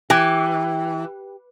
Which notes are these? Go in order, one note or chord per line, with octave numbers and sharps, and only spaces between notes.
E3 G4